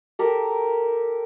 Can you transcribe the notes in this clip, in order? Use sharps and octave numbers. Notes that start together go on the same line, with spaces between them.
G4 A4 A#4